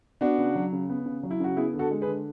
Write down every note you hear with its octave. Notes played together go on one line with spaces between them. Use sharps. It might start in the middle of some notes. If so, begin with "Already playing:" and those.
B3 D4 F#4
C#3
F#3
C#3
B3
C#3
F#3
E4
C#3 F#4
B3 E4 G#4
D3
F#4 A4
G#3
G#4 B4
D3